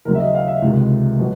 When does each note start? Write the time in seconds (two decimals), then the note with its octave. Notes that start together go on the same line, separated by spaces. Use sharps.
0.05 D#2 C#3 F#3 A#4
0.15 E5
0.20 D#5
0.34 F5
0.47 E5
0.62 C#2 C3 D#3
1.19 B2 F#3